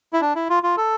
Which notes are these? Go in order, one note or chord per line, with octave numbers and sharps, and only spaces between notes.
E4
D4
E4
F4
F4
A4